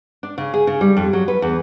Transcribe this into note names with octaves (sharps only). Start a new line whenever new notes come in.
D4
C#3
G#4
C#3
G3
F2
F#3
B4
E2